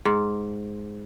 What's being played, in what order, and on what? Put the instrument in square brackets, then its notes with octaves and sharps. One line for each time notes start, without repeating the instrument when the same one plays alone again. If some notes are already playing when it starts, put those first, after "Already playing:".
[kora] G#2